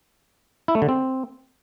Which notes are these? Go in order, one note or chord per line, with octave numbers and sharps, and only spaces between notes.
E4
A3
D3
C4